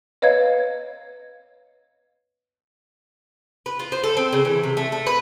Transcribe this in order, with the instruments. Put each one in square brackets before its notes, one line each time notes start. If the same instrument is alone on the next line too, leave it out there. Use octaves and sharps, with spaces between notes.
[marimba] B4 C#5 D#5 F5 G#6
[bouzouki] B4
F4
C5
A4
C4
C#3
E3
C3
A3
A3
B4